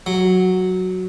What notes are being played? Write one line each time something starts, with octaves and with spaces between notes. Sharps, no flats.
F#3